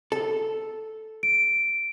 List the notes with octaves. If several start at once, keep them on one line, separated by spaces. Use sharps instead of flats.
A4
D7